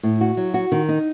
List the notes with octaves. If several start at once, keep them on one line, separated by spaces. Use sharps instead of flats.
A2
F#4
F#3
F#4
D#3
D#4